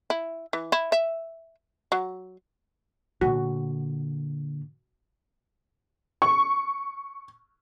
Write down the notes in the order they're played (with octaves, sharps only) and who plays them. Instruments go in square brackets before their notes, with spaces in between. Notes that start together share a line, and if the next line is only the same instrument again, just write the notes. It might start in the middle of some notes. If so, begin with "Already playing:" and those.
[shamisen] E4
E3
E4
E5
F#3
[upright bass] A#2 D3 [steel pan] F#4
[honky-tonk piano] C#6